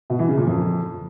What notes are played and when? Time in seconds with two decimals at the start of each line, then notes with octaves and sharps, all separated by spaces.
0.10 B2
0.19 E3
0.28 C#3
0.37 A#2
0.47 F2